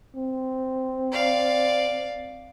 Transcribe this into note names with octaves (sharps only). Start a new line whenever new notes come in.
C4
D5 F5